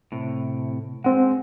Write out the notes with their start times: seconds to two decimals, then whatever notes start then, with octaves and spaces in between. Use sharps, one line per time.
0.12 A2 C3
1.04 G#3 C4 F#5